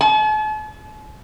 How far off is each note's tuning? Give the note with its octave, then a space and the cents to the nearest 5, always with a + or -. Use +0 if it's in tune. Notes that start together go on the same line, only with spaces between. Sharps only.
A5 -45